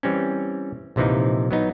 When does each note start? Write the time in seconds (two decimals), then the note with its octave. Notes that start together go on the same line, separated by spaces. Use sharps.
0.03 E3 G3 C4 C#4
0.96 A#1 C3 E3 F3 D#4
1.51 F#3 B3 D#4